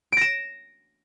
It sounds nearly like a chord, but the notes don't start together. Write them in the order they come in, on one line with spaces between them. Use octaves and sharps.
D7 A#6 E7